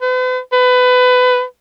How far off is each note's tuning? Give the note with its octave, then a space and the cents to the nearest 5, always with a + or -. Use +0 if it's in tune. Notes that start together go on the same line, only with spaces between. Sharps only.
B4 +45
B4 +25